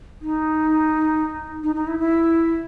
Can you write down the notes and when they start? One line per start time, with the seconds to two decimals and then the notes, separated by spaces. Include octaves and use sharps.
0.21 D#4
1.63 D#4
1.75 D#4
1.87 E4
1.99 E4